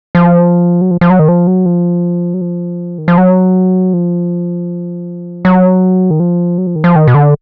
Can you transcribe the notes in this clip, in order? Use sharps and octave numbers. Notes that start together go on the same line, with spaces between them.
F3
F#3
F3
F3
F#3
D#3
F3
F#3
F3
F#3
F3
D#3
F3
F#3
F3
F#3
D#3
F3
F#3
F3
D#3
F3
D#3
B2
D3